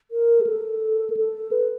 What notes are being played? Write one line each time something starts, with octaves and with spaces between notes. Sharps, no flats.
A#4
G#4
A4
A#4
A4
B4